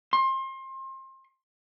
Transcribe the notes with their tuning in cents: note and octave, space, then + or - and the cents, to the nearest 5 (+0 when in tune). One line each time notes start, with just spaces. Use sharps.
C6 +30